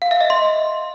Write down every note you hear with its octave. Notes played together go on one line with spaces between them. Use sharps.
F5
E5
D#5
C6